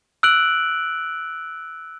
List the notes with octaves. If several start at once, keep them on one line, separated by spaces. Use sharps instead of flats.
E6 F#6 D7 F#7